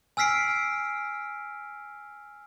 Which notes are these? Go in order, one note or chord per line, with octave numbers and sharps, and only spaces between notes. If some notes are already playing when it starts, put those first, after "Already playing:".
G#5 E6 F6 B6 C7 D7